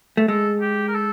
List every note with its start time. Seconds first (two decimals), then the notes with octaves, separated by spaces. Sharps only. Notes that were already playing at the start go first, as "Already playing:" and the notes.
0.17 A3
0.28 G#3 A4
0.61 G4
0.88 A#4
0.95 A4